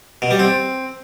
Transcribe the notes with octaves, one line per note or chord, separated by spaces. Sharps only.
B2
G3
C4